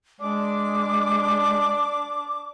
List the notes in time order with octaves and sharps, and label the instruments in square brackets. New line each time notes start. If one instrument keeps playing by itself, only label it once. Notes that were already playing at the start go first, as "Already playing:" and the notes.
[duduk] G#3 [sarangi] D4 [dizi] D6